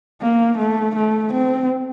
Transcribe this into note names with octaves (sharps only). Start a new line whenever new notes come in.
A#3
A3
A3
C4